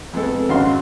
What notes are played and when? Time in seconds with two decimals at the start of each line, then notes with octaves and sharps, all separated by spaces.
0.13 F2 G#3 B3 A4
0.49 G#1 F#2 F#4 F5 C6